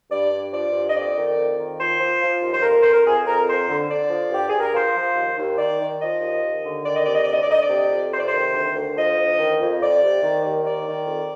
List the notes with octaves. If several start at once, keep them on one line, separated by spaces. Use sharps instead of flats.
G2 D5
G2
F3 D5
G2
D#5
F2 D5
D#3
F2
D#3
F3 C5
F3
F3
D#2
C5
F2 A#4
F2 C5
A#4
F2 G#4
F2 A#4
F3 C5
D3
D3 D5
F3
G2 G4
G#4
G2
A#4
F3 C5
F3
D#2
D#2
D#3 D5
D#3
F3 D#5
D#2
D#2
D3
D#3 D5
D#5
C3 D5
D#5
D5
D2 D#5
D5
D2 D#5
D5
C3
F2
C3 C5
D5
D#3 C5
D2
D2
F3 D#5
D2
D#3
F2
F2 D5
C3
D#3
D#2
D#3 D5
D#3
F2